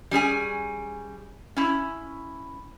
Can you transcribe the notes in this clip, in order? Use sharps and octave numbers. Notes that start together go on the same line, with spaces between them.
G3 C#4 G#4 G#5
C#4 E4